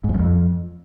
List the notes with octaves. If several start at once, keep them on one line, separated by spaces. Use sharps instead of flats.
G#2
F2
F#2
F2